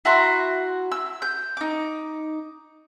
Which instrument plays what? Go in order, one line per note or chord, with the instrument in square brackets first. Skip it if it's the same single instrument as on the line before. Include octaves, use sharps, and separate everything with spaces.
[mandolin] E4 F#4 A#5 C6
E6
G6
D#4 D6